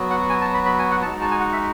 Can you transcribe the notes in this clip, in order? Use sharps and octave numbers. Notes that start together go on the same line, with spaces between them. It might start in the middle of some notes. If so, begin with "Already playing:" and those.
Already playing: F#3 B3 F#4
F#5
G#5
A5
B5
B5
G#5
F#5
G#3 D#4 F#4 A5
A5
G#5
F#5
E5